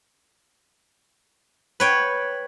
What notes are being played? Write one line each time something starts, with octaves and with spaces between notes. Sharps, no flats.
B4 C#5 G5